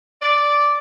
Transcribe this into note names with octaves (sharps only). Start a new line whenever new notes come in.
D5